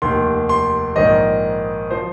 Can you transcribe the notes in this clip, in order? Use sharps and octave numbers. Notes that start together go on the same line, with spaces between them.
F1 D#2 D#3 C6
C6
A#1 G#2 D#3 D#5
F3 C5